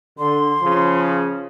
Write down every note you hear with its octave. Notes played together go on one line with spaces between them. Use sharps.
D3 C6
C#3 F3